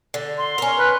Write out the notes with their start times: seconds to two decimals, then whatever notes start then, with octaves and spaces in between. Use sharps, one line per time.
0.14 D3
0.38 C6
0.58 C#4 A#4
0.79 B4